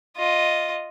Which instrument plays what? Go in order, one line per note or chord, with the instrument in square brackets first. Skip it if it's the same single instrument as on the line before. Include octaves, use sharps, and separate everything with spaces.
[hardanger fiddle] F4 D#5